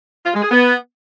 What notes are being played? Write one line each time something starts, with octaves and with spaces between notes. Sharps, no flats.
F4
G#3
G#4
B3